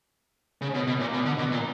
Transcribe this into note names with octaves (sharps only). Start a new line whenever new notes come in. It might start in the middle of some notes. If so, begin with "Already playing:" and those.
C#3
B2
B2
A#2
B2
D3
B2
A#2